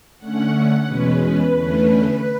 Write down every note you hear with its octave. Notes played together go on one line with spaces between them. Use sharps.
D3 A3 C#4 F#5
E2 B2 G#3 C#4 B4
B4
E2 D3 A3 C#4